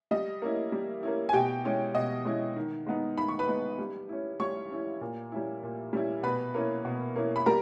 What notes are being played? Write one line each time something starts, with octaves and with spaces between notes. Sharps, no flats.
G3 D#5
A#3 C#4 E4
G3
A#3 C#4 E4
G#5
B2 G4 G5
G#3 C#4 E4
B2 D#5
G#3 C#4 E4
D#3
G#3 B3 D#4
D#3 B5
C#6
B4 B5
G#3 B3 D#4
G3
C#4 E4
G3 C#5 C#6
C#4 E4
A#2
G3 C#4 E4
A#2
G3 C#4 E4
B2 B4 B5
A#3 C#4 E4
B2
A#3 C#4 E4
B5
G3 A#4 A#5